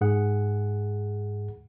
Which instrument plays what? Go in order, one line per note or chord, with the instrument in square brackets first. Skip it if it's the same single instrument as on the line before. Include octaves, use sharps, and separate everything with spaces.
[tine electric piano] G#2 G#4 F#5